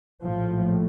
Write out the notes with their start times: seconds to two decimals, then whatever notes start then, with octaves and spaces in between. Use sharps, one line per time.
0.23 A#1 A2 F3